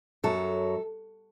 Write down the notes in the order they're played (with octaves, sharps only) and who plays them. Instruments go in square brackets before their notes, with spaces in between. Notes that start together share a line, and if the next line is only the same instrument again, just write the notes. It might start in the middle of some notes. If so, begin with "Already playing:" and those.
[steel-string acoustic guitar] F#2 F#3 A4